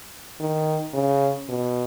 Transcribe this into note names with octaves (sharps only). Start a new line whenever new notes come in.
D#3
C#3
B2